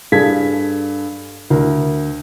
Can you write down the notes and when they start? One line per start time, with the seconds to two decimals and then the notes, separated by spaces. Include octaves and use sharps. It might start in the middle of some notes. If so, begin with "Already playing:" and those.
0.12 G2 G#4 A4 F5 G#6 B6
1.50 D2 A#4